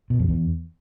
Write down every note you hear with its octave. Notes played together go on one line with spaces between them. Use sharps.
B2
F2
E2